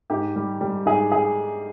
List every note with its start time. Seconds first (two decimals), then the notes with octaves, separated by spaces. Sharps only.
0.10 G#2 G4
0.36 G3
0.61 G3
0.86 G#2 G#4
1.12 G#4